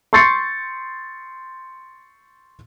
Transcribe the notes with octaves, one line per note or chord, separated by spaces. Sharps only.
C6 C#6 G6 A6 C7 C#7